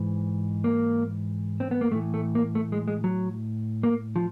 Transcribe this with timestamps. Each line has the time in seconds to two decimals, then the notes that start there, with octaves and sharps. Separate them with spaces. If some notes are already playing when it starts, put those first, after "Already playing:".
Already playing: G#2 E3
0.64 A#3
1.60 C4
1.71 B3
1.81 A#3
1.92 A2 E3 A3
2.14 A3
2.35 A#3
2.55 A3
2.72 G#3
2.88 G#3
3.04 F#3
3.83 A#3
4.16 F3